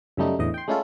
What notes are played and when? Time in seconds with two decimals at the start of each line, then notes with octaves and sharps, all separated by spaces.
0.17 F#2 C#3 G3 A3 D#4
0.39 E2 A2 D3 E3 D#5
0.54 G5 C6
0.68 G#3 A3 C#4 E4 F4 A4